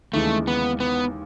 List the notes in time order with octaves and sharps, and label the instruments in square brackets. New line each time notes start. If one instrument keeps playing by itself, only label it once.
[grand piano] D#2 C#3 E3 G#3 [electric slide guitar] A3
[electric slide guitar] B3
B3